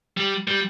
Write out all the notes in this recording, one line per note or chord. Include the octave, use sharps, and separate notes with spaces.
G3
G3